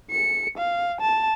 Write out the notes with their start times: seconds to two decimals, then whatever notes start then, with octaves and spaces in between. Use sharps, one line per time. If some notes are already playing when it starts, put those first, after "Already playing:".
0.11 C#7
0.58 F5
1.01 A5